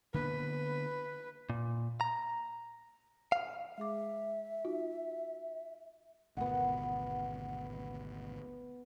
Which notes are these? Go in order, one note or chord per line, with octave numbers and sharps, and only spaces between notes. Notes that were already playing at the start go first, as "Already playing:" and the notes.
D3 A#3 B3 B4
A#2
A#5
F5
G#3 G#4 E5 D6
D#4 F4 F#4
G#1 D2 B2 B3 F#5